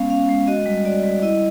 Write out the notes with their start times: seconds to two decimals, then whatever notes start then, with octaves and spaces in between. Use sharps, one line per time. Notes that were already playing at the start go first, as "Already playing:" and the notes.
Already playing: G#3 B3 C#4 F5
0.10 C#4 F5
0.29 G#3
0.47 F#4 D#5
0.66 G3
0.85 F#4 D5
1.03 G3
1.22 E4 D#5